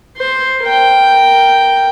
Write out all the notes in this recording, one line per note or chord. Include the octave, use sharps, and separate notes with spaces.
C5
A#4 G5